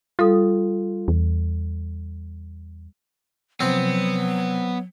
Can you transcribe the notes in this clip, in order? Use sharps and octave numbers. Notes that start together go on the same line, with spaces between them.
G3 F4 A4 D#6
E2
C3 F3 F#3 B3 C4